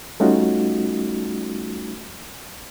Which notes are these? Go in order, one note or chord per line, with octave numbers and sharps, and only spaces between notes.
G3 A3 C#4 D#4 F4 F#4